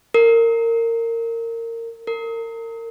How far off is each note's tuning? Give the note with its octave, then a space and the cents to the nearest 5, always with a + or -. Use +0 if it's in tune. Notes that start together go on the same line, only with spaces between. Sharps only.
A#4 -25
A#4 -35